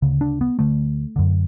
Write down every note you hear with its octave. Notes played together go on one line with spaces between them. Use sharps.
D2 C#3
D4
B3
D2 D3 A3
F#2 D3